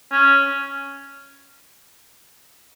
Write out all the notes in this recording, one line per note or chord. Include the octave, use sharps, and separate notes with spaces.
C#4